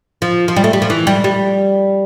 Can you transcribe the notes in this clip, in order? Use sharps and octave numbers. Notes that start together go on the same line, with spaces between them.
F3
F3
G3
A3
G3
F3
E3
G3
G3